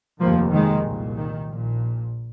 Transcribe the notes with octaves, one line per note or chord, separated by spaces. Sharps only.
F1 D#2 F3 A#3
D#3 G#3
C2 A#2
D#3
A#1 A#2